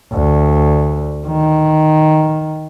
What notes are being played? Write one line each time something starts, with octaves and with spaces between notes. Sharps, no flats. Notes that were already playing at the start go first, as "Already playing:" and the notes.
D2
D#3